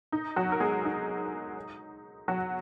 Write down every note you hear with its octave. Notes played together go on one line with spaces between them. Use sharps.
D#4
F#3 F#4
A#4
G#3 G#4
D#4
F#3 F#4